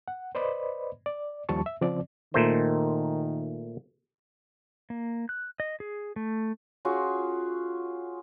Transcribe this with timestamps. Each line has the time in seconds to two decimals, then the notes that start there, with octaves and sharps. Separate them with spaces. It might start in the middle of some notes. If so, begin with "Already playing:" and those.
0.08 F#5
0.35 B4 C5 D5 D#5 B5
1.06 D5
1.49 D#2 F3 G3 A5 C#6
1.66 E5
1.81 C#3 F3 C4 D5
2.34 A#2 D#3 A3 C5
4.90 A#3
5.29 F#6
5.60 D#5
5.80 G#4
6.16 A3
6.85 C#4 F4 F#4 G#4